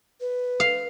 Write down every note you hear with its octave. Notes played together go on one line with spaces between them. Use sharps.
B4
F5